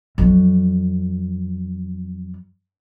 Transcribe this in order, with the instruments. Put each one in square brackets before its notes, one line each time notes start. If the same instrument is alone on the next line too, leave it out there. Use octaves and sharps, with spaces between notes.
[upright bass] F2 F#3